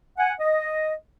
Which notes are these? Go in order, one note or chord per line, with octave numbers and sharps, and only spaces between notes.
F#5 G#5
D#5